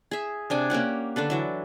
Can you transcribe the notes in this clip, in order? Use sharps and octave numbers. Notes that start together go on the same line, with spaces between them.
G#4 E5
C3 D4 G#5
A#3 C#4 G4 F#5
D3 D4 A4 B4
E3 F#3 E5